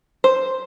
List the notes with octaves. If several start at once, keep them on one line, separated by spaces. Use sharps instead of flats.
C5